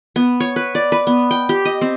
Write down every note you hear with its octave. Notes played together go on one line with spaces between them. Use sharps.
B3
C#5
B4
D5
B4
B3
G5
G4
D#5
C4